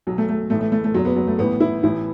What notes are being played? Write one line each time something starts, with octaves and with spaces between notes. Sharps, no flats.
B1 B2 F#3
A3
A3
A1 A2 E3 A3
A3
A3
A3
F#1 E2 B2 F#3
B3
F#3
A3
A1 A2 E3 B3
E4
A1 A2 E3 E4